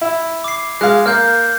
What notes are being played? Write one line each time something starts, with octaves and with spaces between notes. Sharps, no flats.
E4
D6 C7
G#3 F5 F#6
A#3 F6 G6